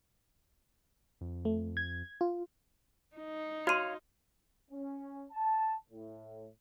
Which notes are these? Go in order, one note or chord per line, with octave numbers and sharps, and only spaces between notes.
F2
A3
G#6
F4
D#4
F#4 C#5 F5 C6 F6 D#7
C#4
A5
A2